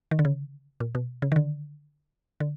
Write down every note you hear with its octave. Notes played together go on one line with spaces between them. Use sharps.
D#3
D3
C#3
A#2
B2
C#3
D#3
D3
D3